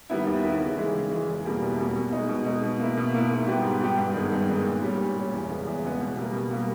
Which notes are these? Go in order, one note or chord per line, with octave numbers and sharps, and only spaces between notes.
D#3 G3 B3 E4
D#2
D#3 G3 B3 E4
C#3
E3 G#3
C#3
E3 G#3
E2
B2 G3 A#3
E2
B2 G3 A#3
B2
G#3 D#4
B2
G#3 D#4
B2
A#3 E4
B2
A#3 E4
G#2
G3 B3 G4
G#2
G3 B3 G4
G2
D#3 G#3 B3
G2
D#3 G#3 B3
A#2
G3 C#4
A#2
G3 C#4
E2
C#3 G#3 B3
E2
C#3 G#3 B3
B2
G3 A#3
B2
G3 A#3